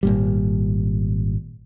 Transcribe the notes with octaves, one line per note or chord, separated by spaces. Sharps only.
G#1 A#2 G3